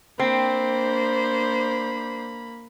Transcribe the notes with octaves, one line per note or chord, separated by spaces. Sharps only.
A#3 C4 D4 C5 B5